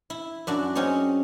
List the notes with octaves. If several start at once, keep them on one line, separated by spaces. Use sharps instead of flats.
E4
F#2 D4 F#4
C4 C#4 D#4 G#4 C#5